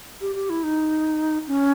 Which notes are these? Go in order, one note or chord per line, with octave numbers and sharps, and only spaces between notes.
G4
G4
E4
D#4
C#4